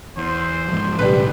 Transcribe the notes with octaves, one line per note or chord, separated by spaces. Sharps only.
E2 C5
G#2 F3
B1 A2 C#3 G3 B4